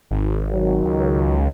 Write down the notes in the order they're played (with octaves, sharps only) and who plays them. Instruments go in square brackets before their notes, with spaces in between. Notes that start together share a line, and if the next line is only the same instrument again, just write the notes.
[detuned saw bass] G#1
[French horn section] D#3 F#3
[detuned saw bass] C#2